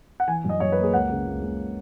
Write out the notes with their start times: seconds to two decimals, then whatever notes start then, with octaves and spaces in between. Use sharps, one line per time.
0.20 F#5
0.28 E3 G#5
0.44 F#2 D#5
0.60 F#2 C#5
0.72 B4
0.77 A#3
0.83 G#4
0.93 C#2 F#5
1.10 C#3
1.27 C#2
1.42 C#2